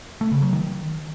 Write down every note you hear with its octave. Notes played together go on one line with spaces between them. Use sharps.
A3
C#3
F#3
D#3